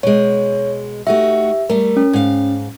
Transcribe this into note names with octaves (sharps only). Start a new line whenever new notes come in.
B2 G#3 C#5
A3 D#4 F#4 G4 E5
G3 A3 A#4
C#4
G#2 F5